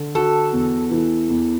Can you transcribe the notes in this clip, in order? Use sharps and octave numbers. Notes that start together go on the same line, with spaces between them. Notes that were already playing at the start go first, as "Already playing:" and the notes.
Already playing: D3
F#4 A4
E2
E3
E2